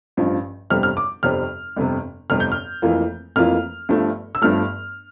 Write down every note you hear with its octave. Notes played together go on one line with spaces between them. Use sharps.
A1 G2 F3
G1 F2 C3 G3 C4 F6
F6
D6
G1 F2 C3 G3 C4 F6
G1 F2 C3
G1 F2 C3 F6
G6
F6
F1 F2 E3 A#3 F4
F1 F2 E3 A#3 F4 F6
G1 G2 F3 A3
E6
G1 G2 F3 A3 F6